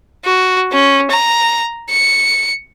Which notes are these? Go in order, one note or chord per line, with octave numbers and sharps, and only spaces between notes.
F#4
C#4
A#5
C#7